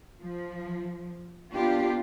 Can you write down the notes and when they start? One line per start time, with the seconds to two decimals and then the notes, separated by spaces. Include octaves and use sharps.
0.20 F3
1.53 A#3 B3 D4 F4 G4